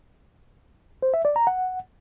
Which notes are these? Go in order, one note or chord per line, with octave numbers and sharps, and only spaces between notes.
C5
E5
D5
A#5
F#5